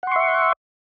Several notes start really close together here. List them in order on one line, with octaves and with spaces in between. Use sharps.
F#5 C6 C#6 E5